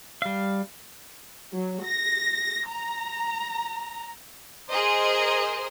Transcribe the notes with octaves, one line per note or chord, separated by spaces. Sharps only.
G3 F5
F#3
A#6
A#5
G#4 A#4 C5 D#5